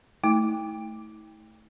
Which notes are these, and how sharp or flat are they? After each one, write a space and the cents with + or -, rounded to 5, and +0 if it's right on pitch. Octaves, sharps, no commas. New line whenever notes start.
A3 +0 E4 -45